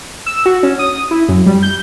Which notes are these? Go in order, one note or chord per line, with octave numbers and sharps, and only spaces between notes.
E6
F#4
C#4
D#6
E4
F#2
G3
G6